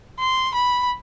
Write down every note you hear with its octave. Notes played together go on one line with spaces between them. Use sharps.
C6
B5